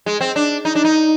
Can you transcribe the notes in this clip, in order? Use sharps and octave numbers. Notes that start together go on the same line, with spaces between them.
G#3
C4
D4
D#4
D4
D#4